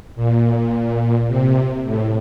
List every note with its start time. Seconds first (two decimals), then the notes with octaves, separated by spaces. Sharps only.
0.16 A#2
1.27 C3
1.84 A2